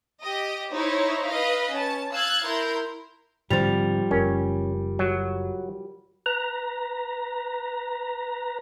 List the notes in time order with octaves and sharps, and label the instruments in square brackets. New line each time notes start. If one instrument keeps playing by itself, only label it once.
[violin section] G4 D#5
D#4 E4 C5 C#5
B4 D#5 F5
C#4 A5
F5 E6 F#6 G#6 A6
E4 A#4 C6 G6
[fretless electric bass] G#2 D3 C4 [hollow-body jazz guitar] F3 G3 [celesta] C5 A6 F7
[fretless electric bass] F#1 [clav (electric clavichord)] C#4 [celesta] A#4
[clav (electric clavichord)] F#3
[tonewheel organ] B4 A#5